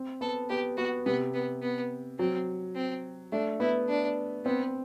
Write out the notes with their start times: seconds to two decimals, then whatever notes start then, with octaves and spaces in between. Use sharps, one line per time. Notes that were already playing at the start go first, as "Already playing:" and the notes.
Already playing: C4
0.21 B3 A4
0.49 B3 G4
0.77 B3 F#4
1.06 C3 B3
1.34 B3
1.62 B3
2.19 F#3 C4
2.75 C4
3.32 A3 D4
3.60 B3 E4
3.89 D4
4.45 B3 C4